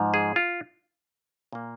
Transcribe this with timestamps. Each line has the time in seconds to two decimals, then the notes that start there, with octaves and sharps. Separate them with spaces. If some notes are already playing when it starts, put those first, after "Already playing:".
Already playing: G#2 F3
0.14 G#4
0.36 F4
1.53 A#2 A#3